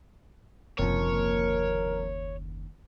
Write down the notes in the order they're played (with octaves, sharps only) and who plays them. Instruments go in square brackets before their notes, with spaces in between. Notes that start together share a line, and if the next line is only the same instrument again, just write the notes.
[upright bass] F#1 D#2 [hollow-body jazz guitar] C3 F3 [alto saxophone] A#4 [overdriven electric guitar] C#5